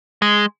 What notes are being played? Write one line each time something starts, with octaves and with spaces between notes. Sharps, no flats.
G#3